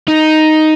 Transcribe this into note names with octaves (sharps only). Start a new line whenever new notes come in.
D#4